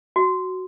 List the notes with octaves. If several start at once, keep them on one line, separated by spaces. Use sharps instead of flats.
F#4